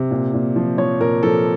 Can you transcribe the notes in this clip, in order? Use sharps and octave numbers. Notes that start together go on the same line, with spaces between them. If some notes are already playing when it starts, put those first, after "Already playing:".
Already playing: C3
A#2
A#2
F3
F3 C#5
A#2 A#4
F3 A4